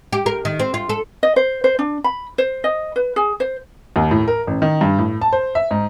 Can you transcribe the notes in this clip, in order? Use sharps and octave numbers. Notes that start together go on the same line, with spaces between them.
G4
A#4
D#3
C4
F4
A4
D#5
C5
C5
D4
B5
C5
D#5
B4
G#4
C5
D#2
A2
A#4
A1
D#3
G2
A2
A5
C5
E5
G#2